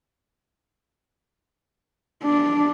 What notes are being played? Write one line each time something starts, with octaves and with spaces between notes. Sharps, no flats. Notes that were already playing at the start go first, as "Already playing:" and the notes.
D4